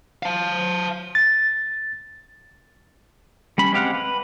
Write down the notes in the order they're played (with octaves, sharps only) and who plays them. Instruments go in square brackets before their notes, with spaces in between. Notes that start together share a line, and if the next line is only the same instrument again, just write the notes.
[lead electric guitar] F5 A5
[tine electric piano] A6
[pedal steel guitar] G3 C#4 B5
G#3 C4 G4 F5 F#5
B4